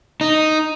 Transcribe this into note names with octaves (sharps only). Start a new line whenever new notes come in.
D#4